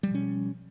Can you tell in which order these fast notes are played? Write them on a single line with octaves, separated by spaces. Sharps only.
G3 F3 B2 C#4